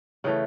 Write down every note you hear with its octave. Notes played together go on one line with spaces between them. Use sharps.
C#3 E3 A3 G5